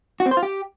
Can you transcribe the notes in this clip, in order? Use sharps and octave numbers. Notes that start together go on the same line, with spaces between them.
F#4
C4
C5
F4
G4